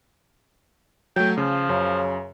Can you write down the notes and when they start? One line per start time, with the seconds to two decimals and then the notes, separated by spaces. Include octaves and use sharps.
1.16 F#3 A3 G5
1.38 C#3 F3
1.69 F#2 C#3